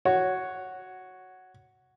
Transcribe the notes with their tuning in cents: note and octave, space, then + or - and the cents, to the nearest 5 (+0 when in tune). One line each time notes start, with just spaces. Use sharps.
F#4 +0 C#5 +0